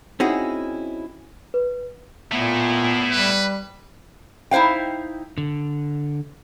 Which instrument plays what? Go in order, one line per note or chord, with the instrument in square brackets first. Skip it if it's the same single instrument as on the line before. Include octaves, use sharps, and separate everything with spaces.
[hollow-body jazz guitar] C4 C#4 D#4 E4 F#4 G#4
[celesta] B4
[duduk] A#2 [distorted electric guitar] A3 E4 [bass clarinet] B3
[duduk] G3 [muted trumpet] B4
[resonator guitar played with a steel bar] D#4 E4 C5 F5 G5
[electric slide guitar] D3